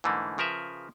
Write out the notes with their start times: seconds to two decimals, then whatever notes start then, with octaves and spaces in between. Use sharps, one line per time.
0.04 G#2 D3 E3 A3 A#3
0.38 C#3 F3 A#4 B4 E5